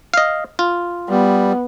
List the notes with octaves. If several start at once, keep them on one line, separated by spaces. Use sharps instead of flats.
D#5 F5
F4
G3 B3